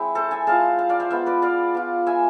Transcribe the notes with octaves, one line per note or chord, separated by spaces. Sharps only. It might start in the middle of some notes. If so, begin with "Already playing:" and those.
Already playing: G#3 C4 E4
A4 C5
E5 G#5
G#3 C4 F4 F5 A5
F5 A5
D5 F5
C5 E5
G#3 B3 F4 C5 E5
B4 D5
D5 F5
B3 F4
E5 G#5